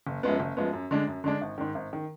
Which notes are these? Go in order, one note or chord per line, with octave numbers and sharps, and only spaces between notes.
F#1
F#2 F3 G#3 B3
F#1
F#2 F3 G#3 B3
F#2
D3 G#3 D4
F#2
D3 G#3 D4
G#1
G#2 D#3
G#1
D#3